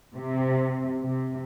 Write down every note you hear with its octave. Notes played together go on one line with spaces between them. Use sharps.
C3
C3